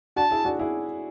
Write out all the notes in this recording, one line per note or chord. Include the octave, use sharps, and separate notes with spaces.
D4 F#4 A5
E4 G#4
D4 F#4
E4 G#4